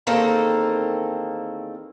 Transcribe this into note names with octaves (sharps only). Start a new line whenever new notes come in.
E2 D#3 A#3 C4 A4 A#5